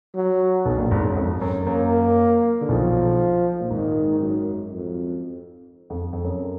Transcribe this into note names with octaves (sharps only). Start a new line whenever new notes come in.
F#3
B1 B2
A#1 A#2
G#1 G#2
F#2
F2
F#2
F#2 A#3
D3
B1 B2 F3
A#2
G#1 G#2 D#3
F#2
F2
F2
F2
F#2